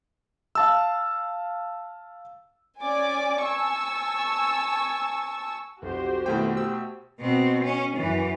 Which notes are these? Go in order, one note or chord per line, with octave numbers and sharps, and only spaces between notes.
F5 A5 E6
C#4 D5 G#5 D6
G#5 A5 C#6 E6
B1 F2 F#4 G4 C5
F2 B2 D#3 A3 E4 G5
E6
B2 C4
C#4
F#2 E3